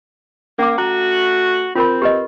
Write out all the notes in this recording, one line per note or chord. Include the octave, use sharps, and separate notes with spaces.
A#3 C#4 D6
A3 F#4 A#5
C4 F4 A#4 B5
G4 B4 D#5